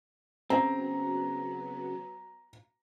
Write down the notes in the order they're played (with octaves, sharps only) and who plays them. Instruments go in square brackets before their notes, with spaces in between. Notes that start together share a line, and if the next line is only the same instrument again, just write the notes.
[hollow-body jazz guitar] C#3 C4 [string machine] F#3 B3 [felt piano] A#5